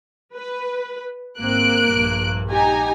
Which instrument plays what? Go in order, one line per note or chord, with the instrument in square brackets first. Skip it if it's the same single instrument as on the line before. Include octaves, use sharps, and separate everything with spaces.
[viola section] B4
[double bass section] G#1 C4 [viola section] A#3 [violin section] F#6 D7
[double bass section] A#1 G2
[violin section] D#4 G#5 A#5 [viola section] G4